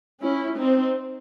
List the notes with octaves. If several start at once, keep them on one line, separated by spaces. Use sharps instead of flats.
C#4 E4
C4 D#4